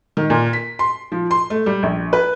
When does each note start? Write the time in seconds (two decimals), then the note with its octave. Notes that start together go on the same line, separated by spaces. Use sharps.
0.17 D#3
0.30 A#2
0.53 B6
0.79 C6
1.12 F3
1.31 C6
1.50 A3
1.66 G3
1.83 A#1
2.13 B4